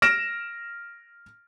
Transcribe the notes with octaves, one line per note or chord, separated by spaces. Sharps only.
F6 A#6 D7 E7